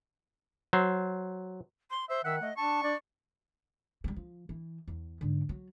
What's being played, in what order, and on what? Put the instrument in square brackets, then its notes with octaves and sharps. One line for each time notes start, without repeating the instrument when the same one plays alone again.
[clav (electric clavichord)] F#3 C5
[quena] C6
[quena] C5 [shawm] E5
[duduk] D#3 [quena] E5 [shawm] F#5
[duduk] A3 [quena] D#5
[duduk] D4 [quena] A5 [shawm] C#6
[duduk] D4 [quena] D5
[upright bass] F3 G3
F3
E3
E2
G#2 D3
F#3